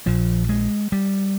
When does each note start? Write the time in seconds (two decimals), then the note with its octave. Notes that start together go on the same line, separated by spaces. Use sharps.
0.06 A#1 A#2 F3
0.49 G#3
0.92 G3